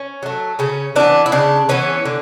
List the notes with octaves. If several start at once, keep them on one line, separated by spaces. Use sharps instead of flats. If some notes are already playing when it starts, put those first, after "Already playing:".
Already playing: C#4
F#3 A3
C#3 C#4
E3 B3 D4
E4
C#3 D4
E3 B3 C#4
D3